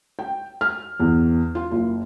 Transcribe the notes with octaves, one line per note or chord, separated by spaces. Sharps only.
G5
F6
E2
F4
F#1